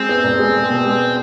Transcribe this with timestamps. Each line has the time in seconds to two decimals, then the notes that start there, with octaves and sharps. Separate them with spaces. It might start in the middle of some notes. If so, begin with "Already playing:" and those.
Already playing: G#3 C4
0.09 E2
0.24 E1
0.39 G#3
0.54 E1
0.70 B2
0.85 G#3